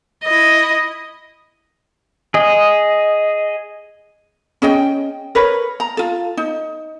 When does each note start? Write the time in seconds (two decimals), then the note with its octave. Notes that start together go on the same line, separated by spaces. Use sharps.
0.24 E4 D#5
2.34 G#4 D#5
4.62 C#4 G#4 D#5 G5
5.35 A#4 B4 C#5
5.80 A#5
5.97 F4 A4
6.37 D#4